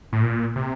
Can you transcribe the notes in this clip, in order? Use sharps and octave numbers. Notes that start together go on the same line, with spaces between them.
A2
A#2
C3